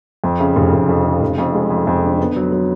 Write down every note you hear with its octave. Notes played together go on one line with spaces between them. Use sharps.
F2
C#3
F1
F1
F2
C#3
F1
F2
G#3
F2
F2
D3
B3
F#3
F#3